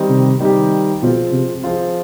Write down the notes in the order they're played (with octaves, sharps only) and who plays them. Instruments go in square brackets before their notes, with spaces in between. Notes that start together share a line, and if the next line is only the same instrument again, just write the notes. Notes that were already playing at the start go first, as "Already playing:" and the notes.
Already playing: [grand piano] D#3 G3 C4 D#4 G4
[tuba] C3
[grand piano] D#3 G3 C4 D#4 G4
[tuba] B2 [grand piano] F3 G#3 C4 F4
[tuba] C3
[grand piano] F3 G#3 C4 F4